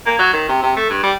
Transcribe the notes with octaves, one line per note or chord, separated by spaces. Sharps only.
A#3
F#3
D#3
C3
C3
A3
G2
G3